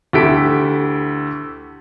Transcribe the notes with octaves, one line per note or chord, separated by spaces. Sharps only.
D2 E4 G4 A4 B6 D7